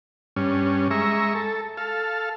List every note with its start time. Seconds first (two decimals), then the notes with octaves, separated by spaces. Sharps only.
0.36 G2 C#4
0.91 G#3 E5 A#5 C#6
1.35 A4
1.77 A4 F5